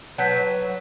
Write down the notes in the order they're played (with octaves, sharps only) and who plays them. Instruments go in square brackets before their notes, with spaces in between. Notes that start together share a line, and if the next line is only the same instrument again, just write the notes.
[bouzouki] F#3 [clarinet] B4 [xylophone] A5 G6 B6